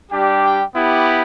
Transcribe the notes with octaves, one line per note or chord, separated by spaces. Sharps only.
G3 D4 G4
G5
B3 E4 G4